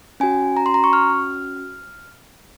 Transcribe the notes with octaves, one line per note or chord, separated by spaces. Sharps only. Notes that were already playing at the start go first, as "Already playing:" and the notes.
C#4 F#4 G#5
A#5
C6
A#5
C#6
F6